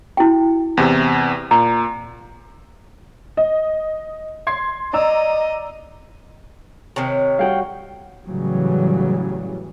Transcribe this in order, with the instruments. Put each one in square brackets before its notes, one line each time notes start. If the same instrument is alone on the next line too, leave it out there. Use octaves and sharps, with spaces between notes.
[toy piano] E4 F#4 G5
[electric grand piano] E2 C3
[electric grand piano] A#2 [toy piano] A#5
[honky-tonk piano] D#5
C6 G#6 C7
[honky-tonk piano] D5 A#5 E6 [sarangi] D#5
[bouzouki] C3 D#3 [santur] C#5
[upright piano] G3 F#4 [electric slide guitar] F5 G5
[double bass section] A2 C#3 E3 F#3 G3